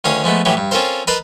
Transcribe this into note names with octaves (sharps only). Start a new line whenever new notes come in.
D2 D#3 C#4 F5 D#6
F3 G#3 A3 B3
A2 E3 F#3 G4
G2
C4 C#4 F4 A4 A#4 C5
A#4 B4 D#5 A5 B5 C6